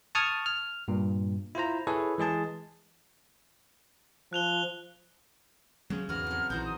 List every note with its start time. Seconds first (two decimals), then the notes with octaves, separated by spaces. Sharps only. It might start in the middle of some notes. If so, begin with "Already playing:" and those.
0.15 A5 C#6 D#6 F6 G#6
0.46 F6
0.88 G2 A#2
1.55 E4 F4 C5 A#5
1.87 E4 G#4 A4 B4 C#5
2.18 E3 G#3 G#4 A5
4.33 F3 F#6 F7 G7
5.90 C#3 F#3 G#3 C#4
6.09 E2 G#2 F#4 B4 F6
6.27 F2 F#3
6.50 A#1 E3 D#4 F#4 C5 G6
6.65 D#6